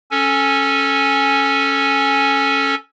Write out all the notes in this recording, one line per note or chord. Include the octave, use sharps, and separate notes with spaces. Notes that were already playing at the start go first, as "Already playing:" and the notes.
C#4 A4 G#5